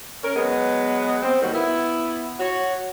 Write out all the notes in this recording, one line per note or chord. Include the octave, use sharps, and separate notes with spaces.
C#4 A#4
F#3 G#3 B3
C4
A2 D#3 F#3 G3 A#3
B3 E4
F#4 C#5